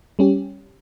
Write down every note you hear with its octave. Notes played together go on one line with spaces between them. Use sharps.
G3 C#4 G4